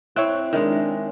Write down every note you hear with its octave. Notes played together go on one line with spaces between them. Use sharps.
C4 E4 C#5 E5 F#6
D#3 G#3 D4